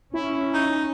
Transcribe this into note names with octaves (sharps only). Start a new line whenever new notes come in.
C#4 E4
D#4